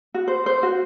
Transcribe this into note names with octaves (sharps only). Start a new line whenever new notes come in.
F#4
C5
C5
F#4